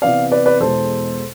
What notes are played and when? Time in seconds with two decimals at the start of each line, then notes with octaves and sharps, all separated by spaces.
0.02 C3 E3 B3 D5 F5
0.32 B4 D5
0.46 B4 D5
0.60 E2 B2 G#3 A4 C5